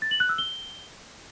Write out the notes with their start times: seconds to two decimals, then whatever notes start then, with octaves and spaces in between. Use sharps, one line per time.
0.02 A6
0.11 F#7
0.20 F#6
0.29 E6
0.38 G7